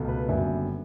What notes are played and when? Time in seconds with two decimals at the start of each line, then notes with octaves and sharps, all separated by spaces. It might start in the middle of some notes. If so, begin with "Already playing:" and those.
Already playing: C#2 B2 A3
0.08 B4
0.28 F#1 F#2 D3 G3 B3 E5